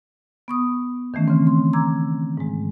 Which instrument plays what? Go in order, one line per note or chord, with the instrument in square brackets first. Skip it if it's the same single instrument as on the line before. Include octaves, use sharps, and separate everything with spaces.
[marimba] B3 C#6 D#6
D#3 E3 A3 C#4
C#3 C4
C6
A#5 D6 E6 G#6
G#2 G#3